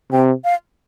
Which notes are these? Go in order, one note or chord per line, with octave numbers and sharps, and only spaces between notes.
C3 G5
F5